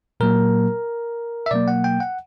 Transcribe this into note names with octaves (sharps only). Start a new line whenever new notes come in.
A#2 F#3 A#3 A#4
E5
B2 F#3 A#3 D5
F#5
G5
F#5